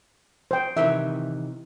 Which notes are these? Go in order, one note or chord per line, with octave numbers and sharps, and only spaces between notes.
C5 G5
C3 D#3 E3 E5